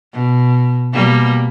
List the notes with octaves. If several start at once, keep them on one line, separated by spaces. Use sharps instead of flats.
B2
B2 G3 A#3